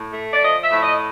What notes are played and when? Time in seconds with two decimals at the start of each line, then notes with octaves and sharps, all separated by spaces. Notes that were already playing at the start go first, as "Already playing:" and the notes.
Already playing: A2
0.13 A3
0.33 D5
0.42 F3 D#5
0.62 E5
0.72 A2
0.81 D#5